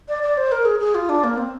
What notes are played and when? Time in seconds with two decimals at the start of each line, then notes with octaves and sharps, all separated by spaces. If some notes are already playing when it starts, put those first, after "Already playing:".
0.08 D5
0.23 D5
0.37 C5
0.52 A#4
0.65 G#4
0.80 G#4
0.95 F4
1.09 D4
1.24 A#3
1.37 C4